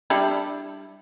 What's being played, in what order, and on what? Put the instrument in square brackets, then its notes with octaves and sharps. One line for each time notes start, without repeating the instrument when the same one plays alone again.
[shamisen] G3 D4 E4